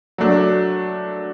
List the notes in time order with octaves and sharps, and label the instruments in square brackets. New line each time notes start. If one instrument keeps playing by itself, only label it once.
[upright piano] F#3 A3 D4